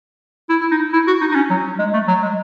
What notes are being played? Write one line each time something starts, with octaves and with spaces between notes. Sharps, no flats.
E4
E4
D#4
E4
F#4
D#4
D#4
C#4
F#3
G#3
A3
F#3
G#3